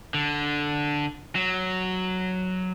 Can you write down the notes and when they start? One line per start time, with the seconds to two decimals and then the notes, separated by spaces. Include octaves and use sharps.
0.14 D3
1.35 F#3